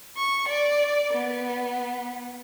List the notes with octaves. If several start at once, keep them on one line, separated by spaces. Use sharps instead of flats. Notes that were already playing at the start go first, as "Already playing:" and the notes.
C#6
D5
B3